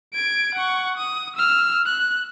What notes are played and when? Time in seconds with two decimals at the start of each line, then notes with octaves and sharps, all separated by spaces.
0.14 G#6 D7
0.55 F#5 C#6
0.98 D#6
1.36 E6 F6
1.86 F#6